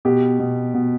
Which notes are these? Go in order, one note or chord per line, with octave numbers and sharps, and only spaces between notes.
B2 G4
B2
B2